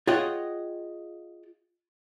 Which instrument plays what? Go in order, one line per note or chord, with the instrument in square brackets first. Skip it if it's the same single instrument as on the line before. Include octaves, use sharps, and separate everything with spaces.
[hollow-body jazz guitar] F4 G#4 C#5 D#5 F#5 G5